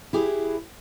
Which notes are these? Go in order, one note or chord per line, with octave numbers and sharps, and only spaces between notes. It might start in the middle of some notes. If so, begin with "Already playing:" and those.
E4 G4 G#4 B4